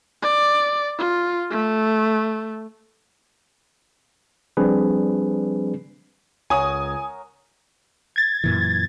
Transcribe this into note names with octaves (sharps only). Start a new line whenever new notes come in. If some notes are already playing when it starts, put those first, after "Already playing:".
D5
F4
A3
F3 G3 C4 D4 G#4 B4
C#2 A#4 C#5 F#5 G#5 D#6
G#6 A6
F#2 A#2 E3